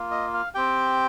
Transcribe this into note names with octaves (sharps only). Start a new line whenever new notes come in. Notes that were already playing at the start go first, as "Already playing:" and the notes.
Already playing: A#3 F4
D#5
F5
C4 G4 G5